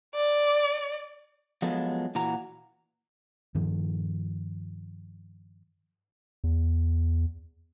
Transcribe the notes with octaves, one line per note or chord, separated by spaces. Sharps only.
D5
F3 F#3 G#3 B3 A4
A#2 E3 F#4 A#5
G2 D#3 F3
E2